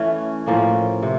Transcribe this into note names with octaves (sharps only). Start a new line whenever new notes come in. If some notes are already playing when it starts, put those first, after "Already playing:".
Already playing: E3 A3 C#4
A2 F3 A#3 C#4
C3